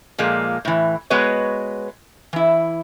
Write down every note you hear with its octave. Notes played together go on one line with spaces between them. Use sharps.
A#2 F3 G#3 A#3
A2 E3
G#3 B3 F#4 B4 C#5 D#5
E3 E4